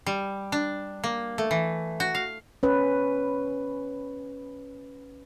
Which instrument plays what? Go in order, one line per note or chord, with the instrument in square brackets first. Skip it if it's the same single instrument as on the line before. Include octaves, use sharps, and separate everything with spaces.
[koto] G3
D4
A#3
A3
E3
F#4
F5
[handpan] C#4 B4